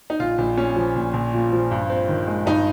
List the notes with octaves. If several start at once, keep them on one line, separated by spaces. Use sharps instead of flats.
D#4
A#1 F4
A#1
A#2 C#4
F3
A#1
A#1
A#2
F3
G2
C4
D#3
G#3
G2 D#4